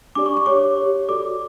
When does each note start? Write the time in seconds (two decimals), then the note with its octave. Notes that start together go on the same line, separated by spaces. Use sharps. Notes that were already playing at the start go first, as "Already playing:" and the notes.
0.15 D4 G4 D5 D6
0.26 C#6
0.37 C#6
0.46 G4 C#5 D6
0.77 G4 C#5
1.09 F#4 A4 D5 D6